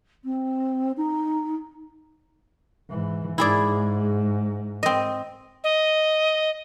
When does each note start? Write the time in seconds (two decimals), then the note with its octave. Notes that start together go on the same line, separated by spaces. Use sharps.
0.24 C4
0.97 D#4
2.90 G#2 E3
3.38 G#2 E4 G#4 D5
4.83 C4 D#5
5.64 D#5